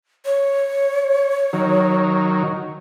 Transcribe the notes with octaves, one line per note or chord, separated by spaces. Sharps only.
C#5
D#3 F#3